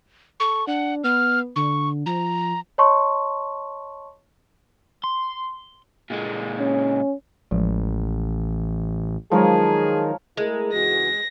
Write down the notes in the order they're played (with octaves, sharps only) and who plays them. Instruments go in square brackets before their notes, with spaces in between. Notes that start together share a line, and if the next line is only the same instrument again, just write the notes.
[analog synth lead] A4 [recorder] C#6
[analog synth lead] D4 [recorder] F#5
[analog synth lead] B3 [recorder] F6
[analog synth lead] D3 [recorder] C#6
[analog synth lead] F3 [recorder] A#5
[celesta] C#5 D#5 A5 C6 C#6
[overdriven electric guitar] C6
A#2 G#3
[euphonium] C#4
[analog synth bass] A1 [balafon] E3 F3 G#3
[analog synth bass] D#3 [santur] F3 A#4 C#5 [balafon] F#3 G#3 [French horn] G#4
[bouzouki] G#3 [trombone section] A3 E4 A#4
[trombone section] C#2 E3 F#4 [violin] A#6